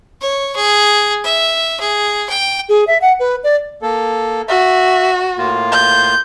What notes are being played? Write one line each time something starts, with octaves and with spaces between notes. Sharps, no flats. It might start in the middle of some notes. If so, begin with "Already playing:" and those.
C#5
G#4
E5
G#4
G5
G#4
E5
F#5
B4
D5
A#3 A4
F#4 E5
A2 A#3 F4
G6